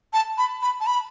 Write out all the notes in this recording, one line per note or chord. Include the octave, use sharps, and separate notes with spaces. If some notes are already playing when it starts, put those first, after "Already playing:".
A5
B5
B5
A5
B5